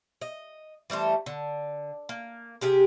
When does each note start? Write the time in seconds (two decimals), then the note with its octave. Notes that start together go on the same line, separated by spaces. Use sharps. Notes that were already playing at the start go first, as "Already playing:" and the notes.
0.22 D#5
0.90 E3 G3 A3 C5
1.26 D3
2.09 A#3
2.61 C3 G4 G#4 A#4